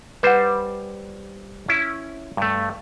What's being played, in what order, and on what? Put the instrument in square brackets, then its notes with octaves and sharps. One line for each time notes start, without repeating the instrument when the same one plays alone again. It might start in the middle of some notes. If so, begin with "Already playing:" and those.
[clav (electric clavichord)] G3 C5 [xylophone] B4 F#5
[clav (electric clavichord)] C#4 E4
G2 A3